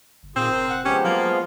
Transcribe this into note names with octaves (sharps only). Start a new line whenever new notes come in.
G1
A#2 D#3 C4 F4 G#4
F1 A#4 C5
F#5
F3 G#3 B3 C#4 G4
F#3 A#3 F4